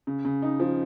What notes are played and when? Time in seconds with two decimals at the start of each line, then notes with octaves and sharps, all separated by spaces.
0.07 C#3
0.25 C#3
0.42 D#4
0.60 F3